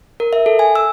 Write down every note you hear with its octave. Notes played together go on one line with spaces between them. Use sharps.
A#4
E5
A4
G#5
E6